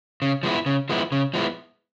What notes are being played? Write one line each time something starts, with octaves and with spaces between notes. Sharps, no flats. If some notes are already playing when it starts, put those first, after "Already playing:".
C#3
F3 G#3 B3 E4
C#3
F3 G#3 B3 E4
C#3
F3 G#3 B3 E4